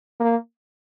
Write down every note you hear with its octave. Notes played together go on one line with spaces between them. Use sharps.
A#3